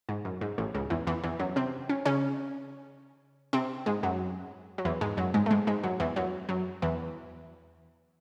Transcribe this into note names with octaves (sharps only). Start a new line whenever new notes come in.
G#2
F#2
G#2
A1 A2
C#2 C#3
E2 E3
E2 E3
E2 E3
F#2 F#3
C3 C4
C#4
C#3 C#4
C3 C4
G#2 G#3
F#2 F#3
F#3
E2 E3
G#2 G#3
F#2 F#3
G#2 G#3
A3
G#2 G#3
G#2 G#3
F#2 F#3
E2 E3
F#2 F#3
F#2 F#3
E2 E3